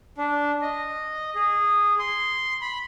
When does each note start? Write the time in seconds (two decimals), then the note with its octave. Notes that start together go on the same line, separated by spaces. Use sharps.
0.18 D4
0.62 D#5
1.35 G#4
1.99 C6
2.61 B5